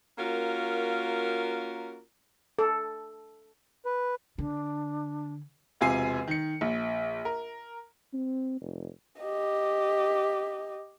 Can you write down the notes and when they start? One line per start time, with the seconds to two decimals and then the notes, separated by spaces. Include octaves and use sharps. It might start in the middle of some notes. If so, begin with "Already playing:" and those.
0.19 A#3 C#4 F4 F#4 A#4
2.59 A4
3.85 B4
4.38 D3 D4
5.81 E1 C3 F4 G#5 C7
6.28 D#3 C#7
6.61 A#1
7.25 A#4
8.13 C4
8.61 F1
9.22 G4 D#5